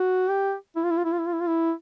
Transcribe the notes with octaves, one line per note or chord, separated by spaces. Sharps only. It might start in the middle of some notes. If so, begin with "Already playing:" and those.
Already playing: F#4
G4
E4
F4
E4
F4
E4
F4
E4
F4
E4
F4
E4